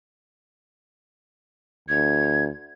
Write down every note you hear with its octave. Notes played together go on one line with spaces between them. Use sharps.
D2 G#6